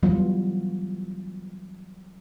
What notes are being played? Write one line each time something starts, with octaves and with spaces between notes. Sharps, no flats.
E3 F#3 G3 B3 F4